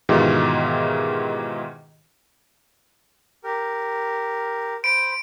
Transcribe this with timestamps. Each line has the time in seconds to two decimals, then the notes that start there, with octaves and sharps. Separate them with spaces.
0.09 G#2 B2 D#3 E3 F4 G4
3.44 G4 A#4
4.84 C5 B5 D7